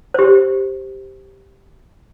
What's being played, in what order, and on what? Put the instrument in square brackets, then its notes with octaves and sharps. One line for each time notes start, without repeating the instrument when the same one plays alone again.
[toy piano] G4 C5